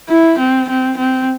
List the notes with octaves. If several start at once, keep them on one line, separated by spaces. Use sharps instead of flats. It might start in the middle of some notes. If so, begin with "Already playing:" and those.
E4
C4
C4
C4